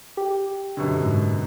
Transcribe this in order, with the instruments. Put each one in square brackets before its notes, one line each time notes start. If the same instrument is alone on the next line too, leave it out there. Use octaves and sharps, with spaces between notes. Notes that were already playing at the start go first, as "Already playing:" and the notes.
[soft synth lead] G4
[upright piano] F#2 B2 D3
[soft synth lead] G#2